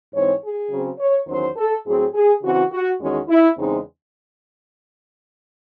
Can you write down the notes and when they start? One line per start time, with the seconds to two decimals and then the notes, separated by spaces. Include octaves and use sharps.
0.13 G#2 E3 C4 C#5
0.42 G#4
0.70 C#3 F#3 C4
0.99 C#5
1.27 E2 D#3 F#3 C#4 C5
1.56 A4
1.85 A2 F#3 C4 G#4
2.14 G#4
2.42 C#3 E3 C4 F#4
2.71 F#4
3.00 E2 D#3 G#3 C#4 F#4
3.28 E4
3.57 E2 C#3 G#3 C4 D#4